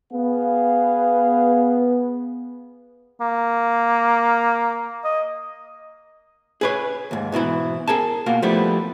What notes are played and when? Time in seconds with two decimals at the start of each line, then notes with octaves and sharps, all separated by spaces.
0.13 B3 G#4 B4 F5
3.21 A#3
5.05 D#5
6.61 G#4 B4 C#5
7.11 D#2 G#2
7.32 G#2 B2 E3 E4
7.88 G#4 A#4 G#5 A5
8.26 B2 A#3 F4 F#4
8.42 F3 G3 A3 B3 E4